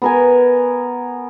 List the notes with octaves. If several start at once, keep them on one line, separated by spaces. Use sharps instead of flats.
B3 A#4 G#5